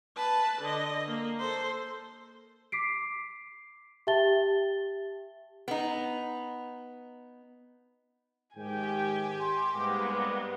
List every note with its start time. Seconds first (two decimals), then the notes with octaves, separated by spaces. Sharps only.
0.16 B4 A5
0.61 D3 D#5
1.08 A#3
1.39 A4 C5
2.72 D6 B6 C7 D7
4.07 G4 E5 G5 A5 A6 G7
5.68 B3 D#4
8.57 G#2 D#3 G4 G5 G#5
9.40 C6
9.75 G#2 G3 G#3 A#3 B3 D6